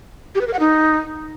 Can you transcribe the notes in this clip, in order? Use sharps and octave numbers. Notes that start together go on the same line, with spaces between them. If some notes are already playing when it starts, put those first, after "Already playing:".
G4
B4
A#4
F#5
D#4